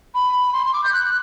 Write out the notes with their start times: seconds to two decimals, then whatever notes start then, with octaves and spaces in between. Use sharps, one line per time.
0.15 B5
0.53 C6
0.66 C6
0.73 D6
0.84 G6
0.93 F#6